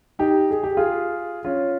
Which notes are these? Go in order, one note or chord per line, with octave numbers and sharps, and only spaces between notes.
D#4 G4
G#4
G4
F4 G#4
C#4 F4